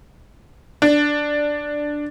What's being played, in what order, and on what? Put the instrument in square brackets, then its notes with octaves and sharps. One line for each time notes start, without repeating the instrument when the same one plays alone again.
[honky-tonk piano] D4